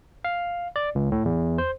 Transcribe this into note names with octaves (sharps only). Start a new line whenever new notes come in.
F5
D5
C#2
A2
E2
C5